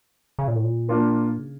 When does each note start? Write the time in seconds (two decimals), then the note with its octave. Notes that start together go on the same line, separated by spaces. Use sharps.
0.39 C#3
0.48 A#2
0.55 A2
0.64 A#2
0.88 A#3 D4 F4 A#4
1.39 C#3